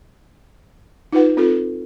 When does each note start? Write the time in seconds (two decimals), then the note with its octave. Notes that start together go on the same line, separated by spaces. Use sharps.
1.13 D#4 F4 B4 F#5
1.37 C4 F4 A4